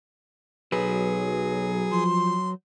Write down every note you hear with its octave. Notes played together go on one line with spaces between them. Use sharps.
B1 F#3 G#4 B4
F3 C6